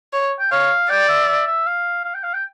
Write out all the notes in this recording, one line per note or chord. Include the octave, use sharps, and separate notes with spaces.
C#5
G5
C#5 F5
D5 G5
E5
E5
E5
F5
F5
G5
F5
G5